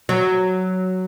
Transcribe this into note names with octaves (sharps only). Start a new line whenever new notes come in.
F#3